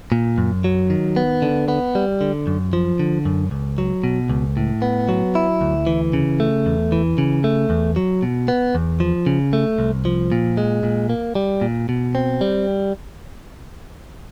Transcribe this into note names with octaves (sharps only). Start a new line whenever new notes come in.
A#2
F#2
F#3
D#3
B3
D3
B3
G3
D3
F#2
F3
D3
F#2
C#2
F#3
B2
C#2
A2
B3
F#3
E4
D2
E3
C#3
A3
E2
E3
C#3
A3
E2
F#3
B2
B3
E2
F3
C#3
A3
C2
F3
A#2
G#3
A#2
A#3
G3
A#2
B2
C4
G3